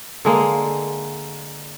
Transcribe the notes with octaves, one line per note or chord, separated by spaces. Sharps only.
D3 G#3 A#3